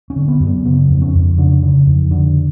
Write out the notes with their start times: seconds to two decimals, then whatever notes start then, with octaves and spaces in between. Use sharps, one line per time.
0.10 C#4
0.16 D3
0.28 B3
0.40 F#2
0.47 B3
0.65 C#3 B3
0.89 F2
1.02 C#4
1.14 F2
1.38 C#3 D4
1.62 C#3
1.86 F2
2.11 D3